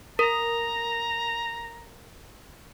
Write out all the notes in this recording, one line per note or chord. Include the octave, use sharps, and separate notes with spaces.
A#4 A#5